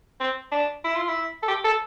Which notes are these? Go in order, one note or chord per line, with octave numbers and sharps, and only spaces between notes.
C4
D4
E4
F4
E4
A4
G4
A4